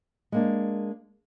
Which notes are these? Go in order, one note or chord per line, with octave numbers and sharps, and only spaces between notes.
G#3 A#3 D4